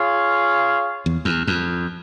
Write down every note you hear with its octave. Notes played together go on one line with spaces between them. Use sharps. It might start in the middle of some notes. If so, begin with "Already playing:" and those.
Already playing: F4 G#4 C#5 F5
E2
E2
F2